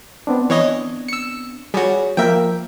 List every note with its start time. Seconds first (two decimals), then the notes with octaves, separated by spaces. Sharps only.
0.27 B3 C4 D4
0.50 E3 C#5 D#5
1.08 E6 C#7
1.74 G3 F#4 G#4 C#5
2.17 F3 A#3 A#4 E5 G5